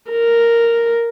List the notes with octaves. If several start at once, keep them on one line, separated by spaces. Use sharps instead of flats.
A#4